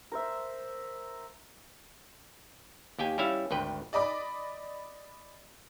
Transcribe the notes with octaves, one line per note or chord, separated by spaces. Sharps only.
A#4 C5 E5
D#2 G4 G5 G#5
G3 C#4 E4 E5 F5
G#1 D2 B4 G5
D5 D#5 B5 D6